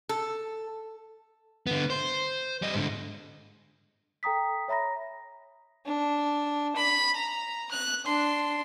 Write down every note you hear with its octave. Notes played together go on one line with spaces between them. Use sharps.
A4
D3 B3
C5
G3 D#5
G#2 D3
A4 G5 A#5 D#6 B6
C#5 E5 A#5 B5 A#6
D4
B5
A#5
F#6
D4 C6